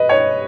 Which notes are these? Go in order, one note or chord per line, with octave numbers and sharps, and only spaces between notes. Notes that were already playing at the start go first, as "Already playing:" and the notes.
Already playing: B4 D#5
C#5